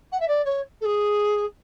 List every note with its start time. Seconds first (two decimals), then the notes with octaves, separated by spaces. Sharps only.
0.12 F#5
0.20 E5
0.28 D5
0.45 C#5
0.81 A4
0.85 G#4